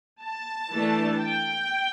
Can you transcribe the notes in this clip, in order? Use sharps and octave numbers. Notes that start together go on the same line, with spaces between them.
A5
E3 A3 D4
G5